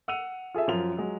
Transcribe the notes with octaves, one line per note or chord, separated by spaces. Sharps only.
F#5 E6 D#7 F7
F4 G#4 A4 E5
F#2 F3 F4 F7
F#3 G#3